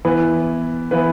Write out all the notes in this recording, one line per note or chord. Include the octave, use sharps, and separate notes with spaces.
E3 B3 E4 B4
E3 B3 E4 B4